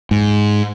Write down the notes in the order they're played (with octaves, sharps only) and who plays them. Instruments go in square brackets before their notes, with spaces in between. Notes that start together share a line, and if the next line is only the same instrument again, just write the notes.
[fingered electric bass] G#2